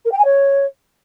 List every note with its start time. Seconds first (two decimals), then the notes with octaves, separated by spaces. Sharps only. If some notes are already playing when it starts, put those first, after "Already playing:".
0.05 A#4
0.11 G5
0.18 G#5
0.24 C#5